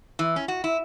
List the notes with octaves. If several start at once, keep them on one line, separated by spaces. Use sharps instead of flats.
E3
C#4
F#4
E4